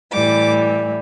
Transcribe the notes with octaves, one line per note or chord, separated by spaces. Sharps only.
A2 E3 G3 D6